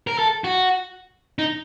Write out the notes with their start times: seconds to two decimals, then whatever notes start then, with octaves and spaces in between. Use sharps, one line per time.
0.07 A#4
0.19 A4
0.44 F#4
1.39 D#4